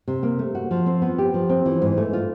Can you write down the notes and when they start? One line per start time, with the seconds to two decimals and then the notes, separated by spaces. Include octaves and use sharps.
0.08 C3
0.23 A#3
0.39 A3
0.55 F#4
0.71 F3
0.86 C4
1.02 B3
1.18 G4
1.34 F3
1.49 C4
1.66 E3
1.82 G#2
1.97 A3
2.13 F4